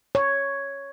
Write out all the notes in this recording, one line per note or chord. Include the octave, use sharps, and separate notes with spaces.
C#5